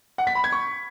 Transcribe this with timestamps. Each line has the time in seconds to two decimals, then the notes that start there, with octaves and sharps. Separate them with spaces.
0.18 F#5
0.27 B6
0.35 B5
0.44 G#6
0.52 C#6